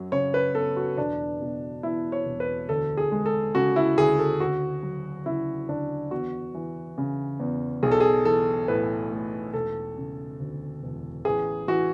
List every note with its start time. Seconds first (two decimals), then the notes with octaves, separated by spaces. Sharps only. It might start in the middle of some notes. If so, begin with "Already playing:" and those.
Already playing: F#2 F#3
0.12 C#3 C#5
0.34 B4
0.54 B3 A4
0.77 F#4
0.98 E1 D4
1.40 B2
1.83 E2 E4
2.12 C#5
2.26 E1
2.40 B4
2.69 D2 A4
2.97 G#4
3.12 G#3
3.26 A4
3.55 C#3 F#4
3.76 E4
3.98 D2 G#4
4.19 A4
4.40 D2 F#4
4.83 F#3
5.26 C#3 E4
5.68 D2 D4
6.11 E2 F#4
6.55 E3
6.98 C#3
7.40 E2
7.83 B1 G#4
7.91 A4
8.00 G#4
8.25 E3 A4
8.68 A2 B4
9.12 A3
9.53 E1 A4
9.97 C#3
10.39 D2
10.83 E1
11.25 A1 G#4
11.68 E3 F#4